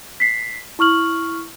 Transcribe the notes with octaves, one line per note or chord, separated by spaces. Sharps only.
B6 C7
E4 C#6 F6 F#7